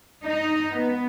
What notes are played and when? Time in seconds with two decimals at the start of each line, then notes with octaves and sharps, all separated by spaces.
0.25 D#4
0.74 B3